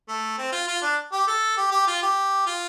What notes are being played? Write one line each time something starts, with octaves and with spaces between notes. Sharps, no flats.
A3
C4
F4
F4
D4
G4
A4
G4
G4
F4
G4
F4